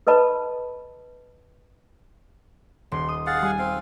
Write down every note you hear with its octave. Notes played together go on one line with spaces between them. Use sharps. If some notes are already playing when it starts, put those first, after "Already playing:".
A4 B4 D#5 A5 B5
D#1 C6
D#6
G#4 F5 F#5 A6
G3 G#5
C4 F5